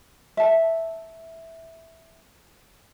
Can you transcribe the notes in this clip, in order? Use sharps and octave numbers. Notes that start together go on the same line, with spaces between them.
E5 A5